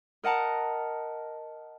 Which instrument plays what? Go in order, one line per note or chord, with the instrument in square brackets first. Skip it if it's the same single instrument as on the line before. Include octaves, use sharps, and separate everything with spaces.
[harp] A#4 D#5 F#5 A5 A#5